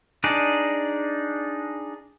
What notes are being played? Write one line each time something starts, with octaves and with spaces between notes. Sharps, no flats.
D4 D#4 G#4 D5